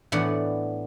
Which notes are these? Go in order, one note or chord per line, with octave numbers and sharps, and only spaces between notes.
A2 E3 B3 D4 F#5